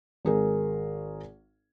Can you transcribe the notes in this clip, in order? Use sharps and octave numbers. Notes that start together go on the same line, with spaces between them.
G#1 G#4 A#4